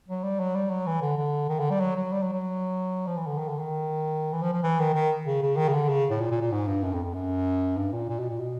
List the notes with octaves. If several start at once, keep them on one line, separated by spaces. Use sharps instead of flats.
F#3
G3
F#3
G3
F#3
E3
D3
D3
D#3
D3
G3
F#3
F#3
G3
F#3
F#3
F3
E3
D3
D#3
D3
D#3
E3
F3
F3
E3
D#3
D#3
C#3
C#3
D#3
C#3
D3
C#3
A2
A#2
A#2
A#2
G#2
G2
F#2
F2
F2
F#2
G2
A#2
A#2
B2
A#2
B2